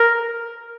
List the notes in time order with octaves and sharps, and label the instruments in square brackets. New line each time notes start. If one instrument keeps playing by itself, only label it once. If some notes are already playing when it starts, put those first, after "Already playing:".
Already playing: [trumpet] A#4